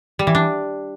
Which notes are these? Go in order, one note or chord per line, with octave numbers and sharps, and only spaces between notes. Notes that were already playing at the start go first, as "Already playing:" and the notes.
G3
E3
D4